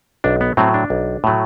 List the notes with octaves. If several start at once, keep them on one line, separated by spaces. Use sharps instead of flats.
B1 D4
B3
A2 F#3 A3 C4
D4
B1
A2 F#3 A3